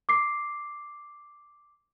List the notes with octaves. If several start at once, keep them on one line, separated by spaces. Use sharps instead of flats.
D6 C7